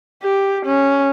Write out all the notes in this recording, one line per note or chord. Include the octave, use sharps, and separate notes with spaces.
G4
C#4